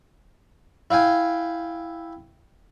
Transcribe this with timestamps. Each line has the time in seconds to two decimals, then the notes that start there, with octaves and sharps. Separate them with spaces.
0.91 E4 F5 G5 G#5